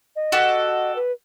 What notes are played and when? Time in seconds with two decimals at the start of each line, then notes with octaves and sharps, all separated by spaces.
0.16 D#5
0.32 F#4 G4 A4
0.96 B4